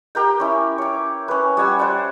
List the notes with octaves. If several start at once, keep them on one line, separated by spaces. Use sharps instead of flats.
G4 A#4 G5
C#4 E4
C#5 D6
C#4 B4
G3 F#5 G#5 E6
C5 D5 F#5